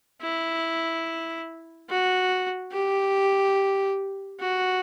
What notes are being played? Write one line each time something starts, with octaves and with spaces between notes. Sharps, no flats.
E4
F#4
G4
F#4